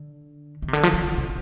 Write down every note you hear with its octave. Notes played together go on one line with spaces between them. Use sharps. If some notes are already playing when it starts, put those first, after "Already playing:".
Already playing: D3
D#3
C3
D3
F3
D#3
D#3
C3